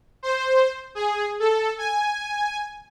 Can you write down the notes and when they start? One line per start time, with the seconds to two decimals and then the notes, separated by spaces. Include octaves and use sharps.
0.23 C5
0.95 G#4
1.40 A4
1.78 G#5